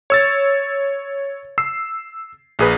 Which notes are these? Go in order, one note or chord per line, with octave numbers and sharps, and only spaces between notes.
C#5 E6 A6
E6 C7
A#1 G#4 B4